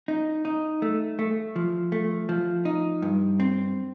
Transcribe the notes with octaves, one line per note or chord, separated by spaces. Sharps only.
D#4
D#4
A3
A3
F3
A3
F3
D#4
G2
C4